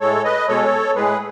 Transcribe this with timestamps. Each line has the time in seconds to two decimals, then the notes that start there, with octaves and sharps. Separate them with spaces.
0.01 A2 G#3 A4 C#5
0.25 B4 D#5
0.48 B2 G#3 A4 C#5
0.96 A2 G#3 G#4 B4